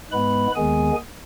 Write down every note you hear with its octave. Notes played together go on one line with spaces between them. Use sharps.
G#2 G#3 B3 B4 B5
D#2 D#3 G#3 B3 G#4 G#5